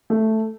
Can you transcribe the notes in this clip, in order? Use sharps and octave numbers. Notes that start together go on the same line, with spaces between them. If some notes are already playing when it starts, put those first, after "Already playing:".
A3